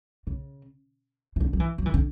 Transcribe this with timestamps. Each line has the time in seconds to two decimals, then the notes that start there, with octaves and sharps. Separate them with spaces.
0.27 C#3
1.36 E3
1.40 D3
1.53 F#3
1.60 E3
1.78 F#3
1.86 E3
1.94 D3